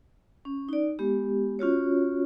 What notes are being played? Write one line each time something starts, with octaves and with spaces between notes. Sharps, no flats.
C#4
D#4 D5
G#3 B3 G4
C#4 F4 F#4 C#5